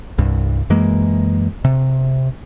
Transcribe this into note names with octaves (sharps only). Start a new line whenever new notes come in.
C2 G2
F#2 E3 G#3 A#3
C3